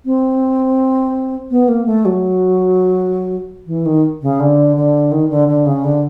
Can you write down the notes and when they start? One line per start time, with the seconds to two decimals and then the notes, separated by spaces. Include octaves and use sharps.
0.05 C4
1.51 B3
1.68 A#3
1.86 A3
2.05 F#3
3.67 E3
3.86 D#3
4.22 C#3
4.40 D3
4.76 D3
5.12 D#3
5.30 D3
5.48 D3
5.66 C#3
5.84 D3